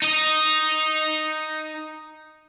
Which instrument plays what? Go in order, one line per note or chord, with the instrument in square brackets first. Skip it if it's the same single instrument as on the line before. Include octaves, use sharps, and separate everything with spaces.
[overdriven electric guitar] D#4 D#5